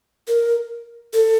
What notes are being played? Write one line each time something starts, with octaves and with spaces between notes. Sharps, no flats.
A#4
A4